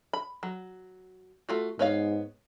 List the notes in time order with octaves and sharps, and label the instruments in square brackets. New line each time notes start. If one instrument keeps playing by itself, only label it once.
[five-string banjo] B5
F#3
A3 F4 F#4
[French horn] G#2 [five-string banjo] B3 C#5 F5